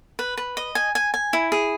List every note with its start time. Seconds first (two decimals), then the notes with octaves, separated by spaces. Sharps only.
0.19 B4
0.37 B4
0.57 D#5
0.75 G#5
0.95 G#5
1.14 G#5
1.33 E4
1.52 G#4